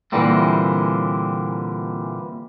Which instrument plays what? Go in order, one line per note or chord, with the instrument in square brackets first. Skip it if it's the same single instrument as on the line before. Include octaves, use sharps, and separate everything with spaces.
[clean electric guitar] A#2 D3 E3 G3 A#3 C4